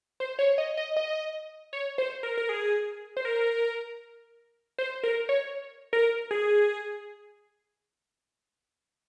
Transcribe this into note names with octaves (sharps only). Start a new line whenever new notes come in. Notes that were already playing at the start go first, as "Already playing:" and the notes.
C5
C#5
D#5
D#5
D#5
C#5
C5
A#4
A#4
G#4
C5
A#4
C5
A#4
C#5
A#4
G#4